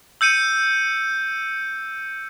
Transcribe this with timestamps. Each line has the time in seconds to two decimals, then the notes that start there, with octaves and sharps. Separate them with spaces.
0.21 E6 G6 C#7 D#7